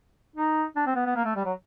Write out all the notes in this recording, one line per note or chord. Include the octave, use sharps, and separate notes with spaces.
D#4
D4
C4
B3
B3
A#3
A3
G3
F#3